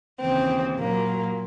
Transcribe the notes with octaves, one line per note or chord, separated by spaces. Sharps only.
D#2 C#3 E3 C4
A#2 F#3 A#3